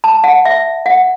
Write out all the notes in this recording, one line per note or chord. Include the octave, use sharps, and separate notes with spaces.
A5
F#5
E5
F#5